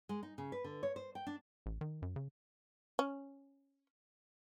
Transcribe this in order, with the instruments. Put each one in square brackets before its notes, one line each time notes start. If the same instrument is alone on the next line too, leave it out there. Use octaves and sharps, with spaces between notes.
[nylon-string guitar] G#3
D#4
C#3
B4
D3
C#5
C5
G5
D4
[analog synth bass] A1
D#3
F#2
C#3
[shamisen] C#4